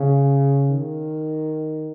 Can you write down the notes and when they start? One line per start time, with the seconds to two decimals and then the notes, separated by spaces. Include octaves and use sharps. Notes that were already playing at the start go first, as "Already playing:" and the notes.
Already playing: C#3
0.69 D#3